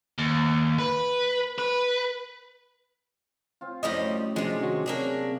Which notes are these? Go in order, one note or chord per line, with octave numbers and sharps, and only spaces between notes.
D#2
B4
B4
C4 F4
F#2 A2 F3 G3 D#5 D6
C3 F3 G#3 D4
D#3 F#4 C#5
C3 A#3 C#4 D4 G#4